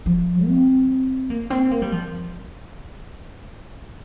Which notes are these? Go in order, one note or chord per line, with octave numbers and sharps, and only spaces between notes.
F3
C4
A#3
C4
A#3
G3
F3